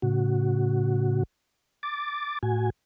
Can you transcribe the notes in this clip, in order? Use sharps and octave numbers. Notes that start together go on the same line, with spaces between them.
A2 C#3 F#4
D6 A6
A2 F#4 G#5